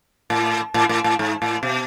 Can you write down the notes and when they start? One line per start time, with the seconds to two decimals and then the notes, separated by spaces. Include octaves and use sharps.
0.30 A2
0.74 A2
0.89 A2
1.04 A2
1.19 G#2
1.42 A2
1.63 B2